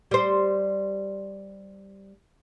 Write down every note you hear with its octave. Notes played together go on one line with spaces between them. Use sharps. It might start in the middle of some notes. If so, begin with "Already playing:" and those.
G3 C5